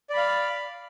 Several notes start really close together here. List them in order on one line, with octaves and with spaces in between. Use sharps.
D5 B5 F5